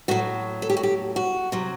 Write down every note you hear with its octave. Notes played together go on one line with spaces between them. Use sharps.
A2 F#3 F#4
A4
G4
F#4
G4
F#4
C3 F#3